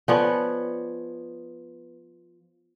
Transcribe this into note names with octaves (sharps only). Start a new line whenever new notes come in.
F3 B3 A4 C#5 D5 G#5